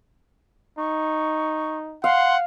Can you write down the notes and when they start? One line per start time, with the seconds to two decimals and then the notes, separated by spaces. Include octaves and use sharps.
0.78 D#4 C#6
2.04 F5 F#5 C6